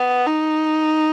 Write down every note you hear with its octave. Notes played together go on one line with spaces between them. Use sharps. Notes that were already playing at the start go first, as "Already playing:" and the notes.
Already playing: B3
D#4